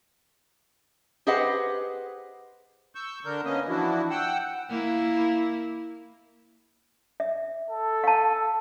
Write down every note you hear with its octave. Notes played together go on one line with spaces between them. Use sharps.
G4 G#4 B4 C5 D#5 F#5
C#6 E6 G6
D3 D4 A#4 G6
A#3 B3 C#4 D#5
E3 F3 D4 E4 F#4
F#5 G5 E6
A#3 E4
E5
A4
F5 A5